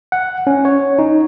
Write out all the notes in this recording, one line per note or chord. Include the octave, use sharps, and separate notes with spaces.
F#5
C#4
C#5
D#4